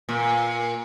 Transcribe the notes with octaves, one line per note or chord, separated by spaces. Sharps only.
A#2